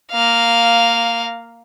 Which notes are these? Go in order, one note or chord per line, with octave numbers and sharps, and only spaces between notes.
A#3 F5